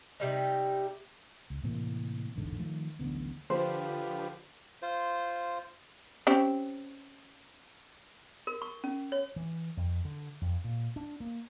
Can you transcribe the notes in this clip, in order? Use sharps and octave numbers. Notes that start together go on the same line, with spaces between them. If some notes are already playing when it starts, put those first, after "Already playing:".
C3 G3 D#4
C#2
A2 C3 E3 A#3
E1 A1 G#2 D3
D#3 F3 A3
D1 A1 D3 B3
D3 F3 F4 G4 B4 C5
F4 C5
C4 C#4 G4
A#4
C#6
C#4
C#5
E3
F2
D3
F2
A#2
D4
A#3